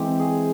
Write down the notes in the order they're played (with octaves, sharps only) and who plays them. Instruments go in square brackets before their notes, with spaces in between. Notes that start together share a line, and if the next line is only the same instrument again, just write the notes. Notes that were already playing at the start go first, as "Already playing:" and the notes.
Already playing: [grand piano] E3 G#3 C4 [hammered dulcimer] G4
[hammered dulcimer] G#4